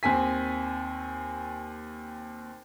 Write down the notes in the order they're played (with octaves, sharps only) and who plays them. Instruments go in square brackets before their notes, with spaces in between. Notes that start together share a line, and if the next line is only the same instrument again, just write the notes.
[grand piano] D#2 C4 G#5 B6